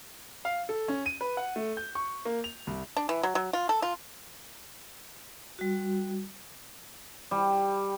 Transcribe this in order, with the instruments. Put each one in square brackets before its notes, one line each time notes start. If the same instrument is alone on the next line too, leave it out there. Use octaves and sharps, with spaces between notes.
[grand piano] F5
A4
C#4
D#7
B4
F#5
A3
G6
C#6
A#3
F7
C2
[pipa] D4
E3
F#3
F#3
F4
A4
F4
[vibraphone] G3 F#4
[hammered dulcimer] G3